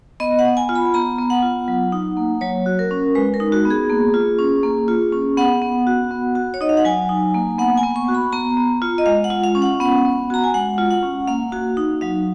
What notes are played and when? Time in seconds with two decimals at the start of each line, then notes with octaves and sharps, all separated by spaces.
0.20 B3 D#5
0.39 F#5
0.45 B3
0.57 G#5
0.69 F4
0.76 B5
0.94 B3 A#5
1.18 B3
1.30 F#5
1.42 F4
1.68 F#3
1.92 D#4
2.17 A#3
2.41 F#3 C#5
2.66 F#4
2.79 A#4
2.91 C#4
3.15 G#3 B4
3.34 A#4
3.40 D#4
3.52 F#4
3.65 B3
3.70 G#4
3.89 A#3
4.14 F4
4.39 C#4
4.63 A#3
4.88 F4
5.13 C#4
5.37 B3 F#5
5.61 B3
5.87 F#4
6.11 B3
6.35 F#4
6.54 C#5
6.61 D#4 D#5
6.69 F5
6.77 F#5
6.85 F#3 G#5
7.09 D#4
7.34 A#3
7.58 B3 F#5
7.77 G#5
7.83 B3
7.96 C#6
8.08 F#4
8.15 B5
8.32 B3 A#5
8.57 B3
8.82 F4
8.98 D#5
9.06 G#3 F5
9.24 F#5
9.30 F4
9.44 F5
9.55 C#4
9.62 F#5
9.80 B3 F#5
10.05 B3
10.30 F#4 A#5
10.44 G#5
10.54 G#3 F#5
10.78 F4
10.91 F#5
11.03 C#4
11.28 A#3 F5
11.52 F#4
11.77 D#4
12.01 F#3 F5